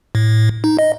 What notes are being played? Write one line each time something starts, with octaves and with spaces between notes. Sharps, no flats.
A2
D#4
D#5